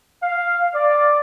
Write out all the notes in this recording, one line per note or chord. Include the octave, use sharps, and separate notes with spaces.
F5
D5